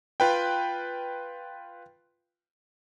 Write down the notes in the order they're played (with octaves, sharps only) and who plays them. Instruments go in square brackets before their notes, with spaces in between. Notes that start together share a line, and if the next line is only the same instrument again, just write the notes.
[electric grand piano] F4 B4 G5